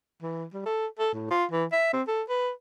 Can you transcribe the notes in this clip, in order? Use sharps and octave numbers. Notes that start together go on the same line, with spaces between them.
E3
G3
A4
A4
A2
F4
E3
E5
C4
A4
B4